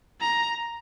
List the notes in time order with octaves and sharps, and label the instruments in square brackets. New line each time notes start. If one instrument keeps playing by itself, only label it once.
[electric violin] A#5